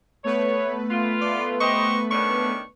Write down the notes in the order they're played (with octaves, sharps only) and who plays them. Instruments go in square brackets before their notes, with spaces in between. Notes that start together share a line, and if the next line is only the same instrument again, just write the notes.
[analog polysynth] A3 B3 B4 [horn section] C#5
[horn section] F4
[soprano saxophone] D5
[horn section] G4 C5 D#5 [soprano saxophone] C#6
[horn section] D#3 C#4 D4 [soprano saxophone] C#6